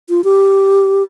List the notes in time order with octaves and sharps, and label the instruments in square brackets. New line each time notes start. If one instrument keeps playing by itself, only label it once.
[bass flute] F4
G4